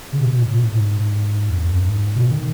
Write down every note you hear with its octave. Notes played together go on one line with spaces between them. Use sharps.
C#3
B2
B2
A2
B2
A2
G#2
E2
F#2
G#2
B2
D#3